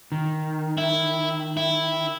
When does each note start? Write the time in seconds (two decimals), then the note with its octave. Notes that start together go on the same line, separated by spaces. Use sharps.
0.12 D#3
0.78 E4
1.57 E4